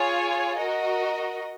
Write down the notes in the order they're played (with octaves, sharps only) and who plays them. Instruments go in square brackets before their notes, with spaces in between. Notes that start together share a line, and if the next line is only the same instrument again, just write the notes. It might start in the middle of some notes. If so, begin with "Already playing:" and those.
Already playing: [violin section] F4 G#4 C#5 G#5
F#4 A#4 D#5